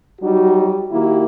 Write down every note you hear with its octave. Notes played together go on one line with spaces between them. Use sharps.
F#3 G3 D#4 F#4
D#3 A#3 E4 F#4 G4